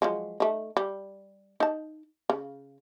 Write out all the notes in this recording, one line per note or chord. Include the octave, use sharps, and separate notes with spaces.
F3 F#3 G#3
A3 D#4
G3
D#4 A5
C#3